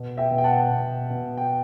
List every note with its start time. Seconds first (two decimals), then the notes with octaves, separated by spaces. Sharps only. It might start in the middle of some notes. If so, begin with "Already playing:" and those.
Already playing: B2
0.17 E5 G5
0.31 B2
0.38 G5
0.44 F#5 A5
0.70 B2
1.10 B2
1.37 G5